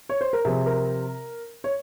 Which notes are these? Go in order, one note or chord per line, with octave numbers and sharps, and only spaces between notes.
C#5
C5
A#4
C3 F3 C4 G#4
A#4
C#5